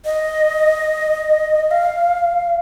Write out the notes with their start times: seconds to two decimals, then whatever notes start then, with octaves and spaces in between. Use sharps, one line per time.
0.05 D#5
1.71 F5